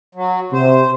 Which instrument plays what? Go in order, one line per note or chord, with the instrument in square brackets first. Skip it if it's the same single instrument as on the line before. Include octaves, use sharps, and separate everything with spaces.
[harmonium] F#3
[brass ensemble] C3 [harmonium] C5